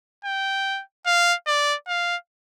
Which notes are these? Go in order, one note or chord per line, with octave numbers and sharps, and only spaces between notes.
G5
F5
D5
F5